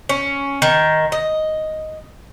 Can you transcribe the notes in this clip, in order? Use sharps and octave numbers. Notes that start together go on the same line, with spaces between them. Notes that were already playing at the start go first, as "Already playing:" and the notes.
C#4
D#3
D#5